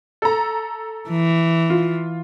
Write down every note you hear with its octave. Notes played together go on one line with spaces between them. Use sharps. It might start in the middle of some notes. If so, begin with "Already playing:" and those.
A4 A#5
E3
F4